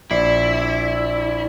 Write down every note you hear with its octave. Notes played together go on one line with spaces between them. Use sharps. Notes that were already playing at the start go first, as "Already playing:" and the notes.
A#1 E4 D5 C7